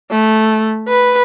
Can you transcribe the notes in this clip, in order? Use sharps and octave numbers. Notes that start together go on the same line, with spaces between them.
A3
B4